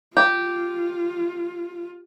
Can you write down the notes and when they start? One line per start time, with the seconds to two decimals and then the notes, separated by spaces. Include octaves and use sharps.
0.17 F4 G4